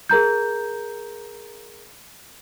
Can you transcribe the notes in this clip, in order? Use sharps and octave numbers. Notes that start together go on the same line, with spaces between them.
G#4 A#4 A#5 G6